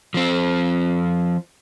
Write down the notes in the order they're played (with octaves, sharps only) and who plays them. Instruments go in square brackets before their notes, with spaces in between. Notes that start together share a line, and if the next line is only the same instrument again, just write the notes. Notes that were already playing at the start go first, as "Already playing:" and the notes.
[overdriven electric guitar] F3 C4